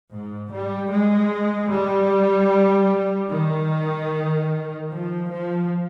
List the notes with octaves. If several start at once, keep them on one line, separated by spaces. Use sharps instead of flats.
G#2
G3
G#3
G3
D#3
F3
F3